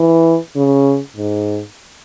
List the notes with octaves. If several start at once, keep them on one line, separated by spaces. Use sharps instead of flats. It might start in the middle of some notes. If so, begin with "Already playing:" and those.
Already playing: E3
C#3
G#2